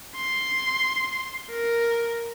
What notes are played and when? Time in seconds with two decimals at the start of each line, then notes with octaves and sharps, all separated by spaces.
0.16 C6
1.50 A#4